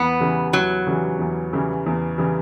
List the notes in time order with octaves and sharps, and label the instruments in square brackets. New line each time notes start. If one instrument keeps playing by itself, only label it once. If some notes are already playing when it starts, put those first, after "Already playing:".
Already playing: [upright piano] E2 [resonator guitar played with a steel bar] B3
[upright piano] C#3 E3 G3
[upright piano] E2 [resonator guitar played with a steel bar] F#3
[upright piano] C#3 E3 G3
E2
C#3 E3 G3
E2
C#3 E3 G3